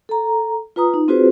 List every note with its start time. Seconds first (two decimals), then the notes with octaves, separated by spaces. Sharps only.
0.09 A4 A#5
0.76 F4 B4 A#5 D#6
0.94 D#4
1.08 C4 F4 F#4 G#4 B4 C5